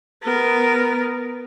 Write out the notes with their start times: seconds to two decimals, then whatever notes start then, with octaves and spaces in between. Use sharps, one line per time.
0.23 B3 A#4